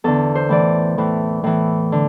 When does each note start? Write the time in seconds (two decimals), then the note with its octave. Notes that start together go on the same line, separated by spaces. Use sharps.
0.04 E2 D3 A4
0.35 C5
0.49 A2 E3 D5
0.98 A2 E3
1.44 A2 E3
1.92 D3